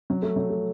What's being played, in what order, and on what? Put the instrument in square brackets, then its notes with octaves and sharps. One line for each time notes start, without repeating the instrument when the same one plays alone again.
[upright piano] F#3
A3
F#3
A3